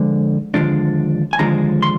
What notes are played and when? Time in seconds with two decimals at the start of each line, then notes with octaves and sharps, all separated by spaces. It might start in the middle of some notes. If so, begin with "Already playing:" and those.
Already playing: D3 F3 G#3
0.54 D#2 D3 F3 G#3 D4
1.33 G#5
1.39 D#2 D3 F3 G#3 D4 A#5
1.83 C6